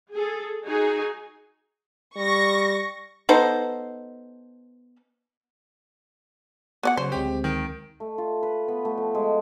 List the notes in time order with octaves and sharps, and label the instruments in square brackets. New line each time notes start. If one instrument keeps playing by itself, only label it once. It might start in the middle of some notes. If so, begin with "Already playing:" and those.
[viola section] G#4 A4
D#4 F#4 G#4 G#5
[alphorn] G3 [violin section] C#6 A#6
[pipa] B3 D#4 A4 C5
[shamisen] B3 D5 F#5
[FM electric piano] C#3 F#3 C#5 [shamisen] C5
[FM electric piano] D2 G#3 C4 [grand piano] G4
[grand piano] D#3
[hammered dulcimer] A3
F4
B4
B3
A3
F3
G#3